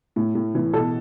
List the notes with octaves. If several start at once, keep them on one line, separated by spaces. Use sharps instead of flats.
A2
A2
E3
B2 A4